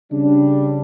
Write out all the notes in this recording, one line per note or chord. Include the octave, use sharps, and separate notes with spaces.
C#3 G3 D4